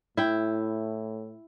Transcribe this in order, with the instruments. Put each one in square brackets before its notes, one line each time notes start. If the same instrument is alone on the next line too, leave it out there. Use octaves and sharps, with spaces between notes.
[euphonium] A2 [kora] E4 G5